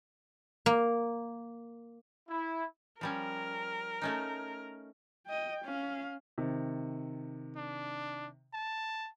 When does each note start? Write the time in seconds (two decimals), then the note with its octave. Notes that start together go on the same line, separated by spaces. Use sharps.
0.66 A#3
2.28 E4
3.01 F3 G3 C#4 A#4
4.02 A3 C#4 D#4
5.27 D#5 G5
5.65 C#4 F5
6.38 C3 D#3
7.56 D4
8.54 A5